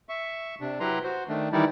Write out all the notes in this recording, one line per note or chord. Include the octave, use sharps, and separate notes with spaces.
E5 C#6
C3 D4
F#3 E4 G4 B4 A#5 C6
F#4 C5
D#3 A3 D4
D#3 E3 G3 D#4 E4 D5